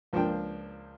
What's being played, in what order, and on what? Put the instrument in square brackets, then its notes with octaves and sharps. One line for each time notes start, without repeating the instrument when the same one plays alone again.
[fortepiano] C#2 F3 A#3 D4 G5